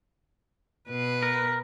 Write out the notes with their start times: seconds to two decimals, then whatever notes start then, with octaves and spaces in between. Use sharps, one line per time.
0.89 B2 B4
1.23 A#4